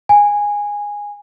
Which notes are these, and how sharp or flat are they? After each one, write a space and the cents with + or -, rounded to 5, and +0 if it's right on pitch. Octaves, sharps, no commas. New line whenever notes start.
G#5 -15